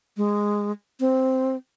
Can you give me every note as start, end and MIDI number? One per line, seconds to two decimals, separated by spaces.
0.17 0.72 56
1.00 1.56 60